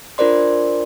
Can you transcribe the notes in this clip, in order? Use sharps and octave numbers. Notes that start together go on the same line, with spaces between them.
D4 F4 A#4 C5 D5 C6